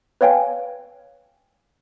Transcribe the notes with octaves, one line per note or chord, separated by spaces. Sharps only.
B4 C#5 F5 G5 G#5